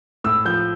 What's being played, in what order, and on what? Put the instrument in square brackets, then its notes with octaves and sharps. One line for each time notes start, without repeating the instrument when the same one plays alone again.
[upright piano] A2 [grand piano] E6
[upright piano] F3 [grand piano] G6